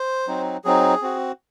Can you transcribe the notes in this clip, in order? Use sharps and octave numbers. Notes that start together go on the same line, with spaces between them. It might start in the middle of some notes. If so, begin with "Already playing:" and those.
Already playing: C5
F#3 C4 D#4
F#3 C4 D#4 G#4
C4 F#4